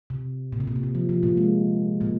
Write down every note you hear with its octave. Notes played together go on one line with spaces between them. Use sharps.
C3
A#2
C3
A#2
C3
A#2
F3
F3
A#2 A#3
G#3
A#2 A#3